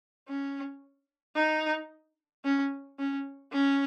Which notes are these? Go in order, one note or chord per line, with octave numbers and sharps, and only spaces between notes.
C#4
D#4
C#4
C#4
C#4